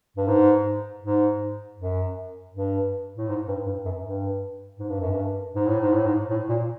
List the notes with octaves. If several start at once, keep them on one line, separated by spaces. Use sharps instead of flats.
G2
G#2
G#2
F#2
G2
A2
G#2
G2
G2
F#2
G2
G#2
G2
F#2
G2
G#2
A2
G#2
A2
G#2
A2
A#2